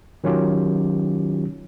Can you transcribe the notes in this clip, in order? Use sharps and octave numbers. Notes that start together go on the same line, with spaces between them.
D#3 F#3 C#4 F4 G4